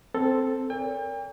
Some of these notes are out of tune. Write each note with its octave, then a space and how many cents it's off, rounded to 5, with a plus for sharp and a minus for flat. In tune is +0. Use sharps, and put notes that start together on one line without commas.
C4 +0 A4 +0
A#4 -10 D5 -45 G5 +40